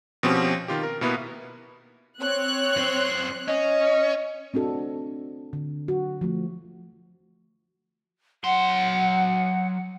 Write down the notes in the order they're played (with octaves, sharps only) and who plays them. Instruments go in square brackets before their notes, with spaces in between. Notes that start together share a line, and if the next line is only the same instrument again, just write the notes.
[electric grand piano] B2 F3 C4 C#4 G4
D#3 F4 G4
A#4
B2 A#3 B3 E4 B4
[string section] C4 C#5 F#6
[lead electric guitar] F#2 C5
[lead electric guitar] C#4 [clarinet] D#5
[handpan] C4 D4 F#4 A4
D3
F#4
F3 A3
[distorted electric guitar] F#3 C6 [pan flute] F#5